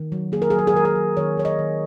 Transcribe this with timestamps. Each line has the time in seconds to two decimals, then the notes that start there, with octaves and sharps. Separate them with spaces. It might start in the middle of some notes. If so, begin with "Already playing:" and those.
Already playing: D#3
0.12 F#3
0.32 A#3 G#4
0.42 A#4
0.50 F#3 G#4
0.59 A#4
0.67 G#4
0.74 D#3 A#4
0.85 G#4
0.95 F#3
1.17 D#3 C#5
1.37 D#3 C#5
1.45 D#5
1.59 D#3